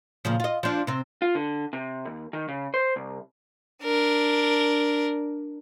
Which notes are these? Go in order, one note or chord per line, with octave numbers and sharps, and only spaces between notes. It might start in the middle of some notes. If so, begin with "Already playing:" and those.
A#2 C#3 F3
F4 D#5
F3 D4
C3 C4
F4
D3
C3
D#2
D#3
C#3
C5
C2
D4 A#4